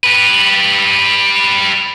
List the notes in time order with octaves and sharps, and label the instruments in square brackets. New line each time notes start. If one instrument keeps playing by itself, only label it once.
[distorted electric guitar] G4 B4